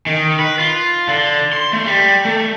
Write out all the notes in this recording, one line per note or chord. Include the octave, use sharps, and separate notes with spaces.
D#3
B4
F4
D3
C6
A3
G3
A3